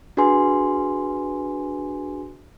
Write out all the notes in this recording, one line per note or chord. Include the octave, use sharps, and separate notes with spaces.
D4 F#4 G#4 B4 G#5 C6